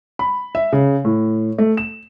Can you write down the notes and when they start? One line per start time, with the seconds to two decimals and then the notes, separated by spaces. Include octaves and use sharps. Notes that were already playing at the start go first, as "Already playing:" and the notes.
0.19 B5
0.55 E5
0.73 C#3
1.05 A2
1.58 A3
1.77 E7